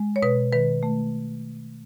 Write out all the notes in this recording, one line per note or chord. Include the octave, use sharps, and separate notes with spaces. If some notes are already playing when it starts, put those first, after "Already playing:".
Already playing: G#3
C#5
B2 B4
D#3 B4
A3